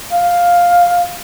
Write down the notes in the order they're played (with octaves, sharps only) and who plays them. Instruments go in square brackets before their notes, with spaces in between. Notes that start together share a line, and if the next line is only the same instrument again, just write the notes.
[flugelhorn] F5